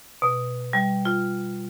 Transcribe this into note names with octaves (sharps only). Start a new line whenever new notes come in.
B2
G3
F4